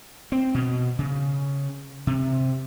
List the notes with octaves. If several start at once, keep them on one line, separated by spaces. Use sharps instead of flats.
C4
B2
C#3
C3